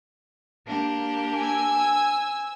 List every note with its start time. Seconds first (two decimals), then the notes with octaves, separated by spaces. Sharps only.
0.66 A#3 D4 G4
1.37 G#5 E6